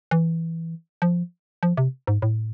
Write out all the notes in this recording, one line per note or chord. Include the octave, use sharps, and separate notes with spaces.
E3
F3
F3
C3
G#2
A2